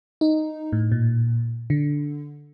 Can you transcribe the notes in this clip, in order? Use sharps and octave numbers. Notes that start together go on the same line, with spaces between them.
D#4
A2
A#2
D3